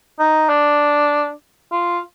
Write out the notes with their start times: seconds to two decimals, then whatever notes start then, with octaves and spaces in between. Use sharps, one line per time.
0.19 D#4
0.49 D4
1.72 F4